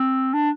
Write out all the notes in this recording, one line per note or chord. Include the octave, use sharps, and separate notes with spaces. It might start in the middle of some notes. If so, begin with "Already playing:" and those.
Already playing: C4
D4